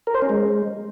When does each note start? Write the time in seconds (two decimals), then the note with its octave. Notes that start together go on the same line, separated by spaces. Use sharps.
0.07 A#4
0.15 C5
0.22 C#4
0.29 G#3